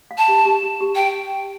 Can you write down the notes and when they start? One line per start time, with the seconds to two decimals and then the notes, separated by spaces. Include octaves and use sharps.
0.11 F5
0.18 A5
0.28 G4
0.45 G4
0.63 G4
0.80 G4
0.95 G5